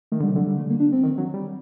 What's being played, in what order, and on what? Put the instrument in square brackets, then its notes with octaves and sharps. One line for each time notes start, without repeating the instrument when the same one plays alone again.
[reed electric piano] D#3 [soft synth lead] A3
[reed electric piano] D3 [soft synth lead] G3
[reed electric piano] C3
[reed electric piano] D3 [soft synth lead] F#3
[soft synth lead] G3
A3
A#3
D4
C4
[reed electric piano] D#3
F#3
G3